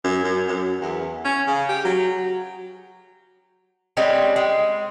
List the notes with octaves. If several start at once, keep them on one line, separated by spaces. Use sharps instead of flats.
F#2
F#2
F#2
E2
C#4
C#3
G4
F#3
G3 G#3 C4 C#4
G#3